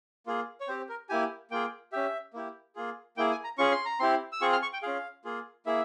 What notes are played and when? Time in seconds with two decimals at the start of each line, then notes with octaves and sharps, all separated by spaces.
0.27 A#3 F4 G#4
0.61 C#5
0.68 C4 G4 C5
0.89 A#4
1.09 A#3 E4 G4 G#5
1.51 A#3 F4 G#4 G5
1.92 C#4 G4 E5
2.34 A#3 E4 G4
2.76 A#3 F4 G#4
3.17 A#3 E4 G#4 G5
3.31 G#5
3.44 A#5
3.58 C#4 F4 G#4 C#6
3.72 C6
3.85 A#5
3.99 C4 E4 G4 C6
4.32 E6
4.41 C4 F4 G#4 C#6
4.52 F6
4.62 C#6
4.73 G5
4.82 C#4 F4 G#4 F5
5.25 A#3 F4 G#4
5.66 A#3 E4 G#4 E5